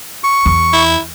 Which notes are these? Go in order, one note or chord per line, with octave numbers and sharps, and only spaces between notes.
C#6
E2
E4